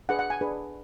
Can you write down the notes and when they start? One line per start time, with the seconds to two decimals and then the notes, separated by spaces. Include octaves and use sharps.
0.09 D4 G#4 B4 F#5
0.19 F#5
0.30 G#5
0.41 D4 G#4 B4